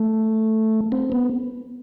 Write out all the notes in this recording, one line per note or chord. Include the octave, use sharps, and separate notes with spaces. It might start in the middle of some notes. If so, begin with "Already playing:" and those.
Already playing: A3
C4
B3